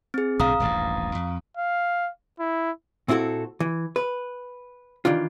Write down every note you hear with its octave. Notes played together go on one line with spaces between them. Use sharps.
C4 G#4
B1 A2 D3 F5 A#5 D#6
D#1 A1 G2
F2
F5
E4
A#2 C4 E4 F#4 A4
E3
B4
D#3 E3 D4 F4